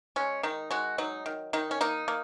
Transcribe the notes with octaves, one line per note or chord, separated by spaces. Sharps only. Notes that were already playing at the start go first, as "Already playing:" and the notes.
G#3 C#4
D#3 D#4
G#3 F#4
F#3 D#4
D#3
D#3 D#4
C#4
A#3 D#4
A#3